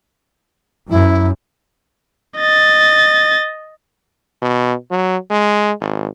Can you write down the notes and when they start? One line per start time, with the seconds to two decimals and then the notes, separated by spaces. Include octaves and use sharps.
0.90 F#2 E4
2.37 D#5 A6
4.42 B2
4.91 F#3
5.30 G#3
5.81 G#1